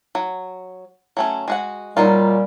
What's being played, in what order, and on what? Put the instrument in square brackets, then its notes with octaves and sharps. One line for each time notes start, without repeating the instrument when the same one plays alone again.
[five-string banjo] F#3
F#3 A3 C#4
G#3 F#4 F#5
[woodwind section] A#2 G3 [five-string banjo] F#3 D#4 F4